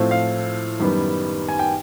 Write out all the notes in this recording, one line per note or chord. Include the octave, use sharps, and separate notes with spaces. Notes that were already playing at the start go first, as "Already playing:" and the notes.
Already playing: A2 F3 A3 C4
F5
F#2 D#3 G3 B3
G#5
G5